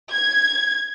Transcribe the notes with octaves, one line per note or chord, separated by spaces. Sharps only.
G#6